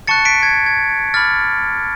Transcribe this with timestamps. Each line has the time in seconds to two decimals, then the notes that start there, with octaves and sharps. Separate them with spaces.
0.07 A5 C#6 F#6 A6 C#7
0.18 C#7
0.25 B6 D7
0.43 G#6
0.66 G#6
1.14 B5 D6 F6 A6